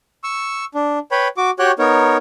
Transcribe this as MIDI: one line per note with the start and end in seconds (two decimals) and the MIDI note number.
0.24 0.65 85
0.24 0.65 88
0.74 0.99 62
1.12 1.28 71
1.12 1.28 73
1.12 1.28 79
1.12 1.28 83
1.37 1.51 66
1.37 1.51 86
1.59 1.72 66
1.59 1.72 67
1.59 1.72 73
1.59 1.72 79
1.59 1.72 90
1.79 2.17 59
1.79 2.17 63
1.79 2.17 70
1.79 2.17 73